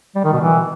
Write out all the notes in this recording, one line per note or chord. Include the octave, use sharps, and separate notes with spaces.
G3
D#3
B2
E3